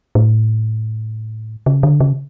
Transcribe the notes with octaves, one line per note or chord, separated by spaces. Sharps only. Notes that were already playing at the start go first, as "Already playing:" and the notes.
A2
C#3
D3
C#3